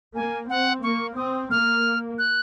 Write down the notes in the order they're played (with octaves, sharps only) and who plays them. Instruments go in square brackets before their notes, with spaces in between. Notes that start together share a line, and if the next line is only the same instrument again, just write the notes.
[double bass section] A#3 [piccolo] G#5
[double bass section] C4 [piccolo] F#5
[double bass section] A#3 [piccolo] C#6
[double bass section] C4 [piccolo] D#6
[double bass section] A#3 [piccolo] F6
[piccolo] F#6